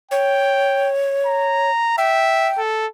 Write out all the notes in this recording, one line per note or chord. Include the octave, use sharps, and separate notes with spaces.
C#5 G5
A#5
E5 G5
A4